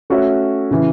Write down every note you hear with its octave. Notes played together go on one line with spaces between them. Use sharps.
A3 C#4 F#4 C#5 E5
C#3 E3